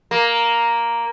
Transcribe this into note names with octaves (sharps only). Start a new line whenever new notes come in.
A#3